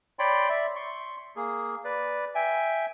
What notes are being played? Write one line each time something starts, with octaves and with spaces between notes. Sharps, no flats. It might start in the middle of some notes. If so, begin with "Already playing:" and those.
C#5 D5 G5 B5 C6
D5 E5
C6 C#6
A#3 G#4
B4 D5
E5 G5 G#5